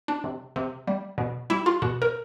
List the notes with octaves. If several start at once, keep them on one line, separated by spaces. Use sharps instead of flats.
D4
C3
C3
G3
B2
G3 E4
F4
B2 F#4
A#4